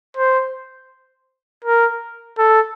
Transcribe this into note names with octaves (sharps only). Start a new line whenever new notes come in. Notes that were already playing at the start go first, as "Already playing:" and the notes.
C5
A#4
A4